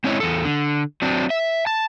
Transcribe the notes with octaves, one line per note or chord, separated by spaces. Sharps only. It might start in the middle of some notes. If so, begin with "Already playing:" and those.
G#3 C4 C#4 E4 C#5 D#5
E2 A4
D3
F#3 C4 D4
E5
A5